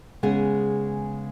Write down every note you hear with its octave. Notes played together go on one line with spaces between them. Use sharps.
C#3 G#3 B3 G#4